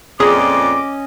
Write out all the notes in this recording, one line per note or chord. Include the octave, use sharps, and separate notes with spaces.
F2 A#2 C#4 G#4 D5 D#5 D6